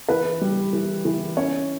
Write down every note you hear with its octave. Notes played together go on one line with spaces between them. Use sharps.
E3 B4
G3
E3
E3
C#4 C#5